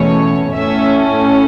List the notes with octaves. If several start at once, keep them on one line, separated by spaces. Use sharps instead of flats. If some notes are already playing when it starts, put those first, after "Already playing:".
Already playing: E2 B2 A3 C#4 C#5
A2 A3 C#4 E5